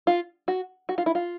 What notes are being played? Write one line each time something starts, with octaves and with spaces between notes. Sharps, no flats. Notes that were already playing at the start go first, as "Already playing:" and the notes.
F4
F#4
F#4
F4
E4
F4